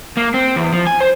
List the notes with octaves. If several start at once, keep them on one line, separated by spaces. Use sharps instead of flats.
A#3
C4
E2
F3
G#5
C5